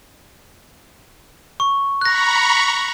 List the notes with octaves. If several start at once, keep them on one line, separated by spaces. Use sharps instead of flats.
C#6
A#5 B5 C#6 F#6 A#6